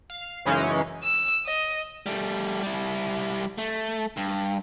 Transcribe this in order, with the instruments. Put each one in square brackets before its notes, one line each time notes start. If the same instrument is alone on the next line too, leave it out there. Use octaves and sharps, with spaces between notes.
[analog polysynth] F5
F#2 C#3 E3 G#3 C#4 D#4
[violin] E6
D#5
[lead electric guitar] G3 A3
G3 E4
A3
G2